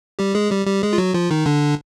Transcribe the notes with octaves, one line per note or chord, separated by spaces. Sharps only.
G3 G4
G#3 G#4
G3 G4
G3 G4
G#3 G#4
F4
F#3 F#4
F3 F4
D#3 D#4
D3 D4